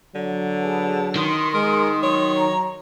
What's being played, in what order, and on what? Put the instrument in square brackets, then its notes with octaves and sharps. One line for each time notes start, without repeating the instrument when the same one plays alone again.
[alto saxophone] D3 [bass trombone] F#3
[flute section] G#4 B4 A5
[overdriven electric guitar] D#3 [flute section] C6 D#6
[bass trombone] G#3 [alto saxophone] A#4
[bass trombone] F#3 [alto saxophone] C#5
[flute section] A#5